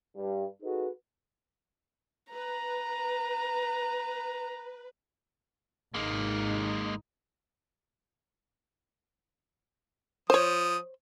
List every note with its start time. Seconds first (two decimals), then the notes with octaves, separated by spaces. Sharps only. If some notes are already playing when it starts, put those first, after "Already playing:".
0.15 G2
0.62 D#4 F#4 G#4 A4 B4
2.34 B4 A#5
5.94 G#1 G#3 A#3 D#4
10.30 F3 C5 C#5 D#6